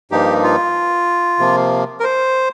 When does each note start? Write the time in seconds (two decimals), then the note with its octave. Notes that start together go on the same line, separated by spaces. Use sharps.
0.11 G2 F3 A#3 D#4 G4
0.44 F4
1.39 C3 F3 A#3
2.00 A#4
2.04 C5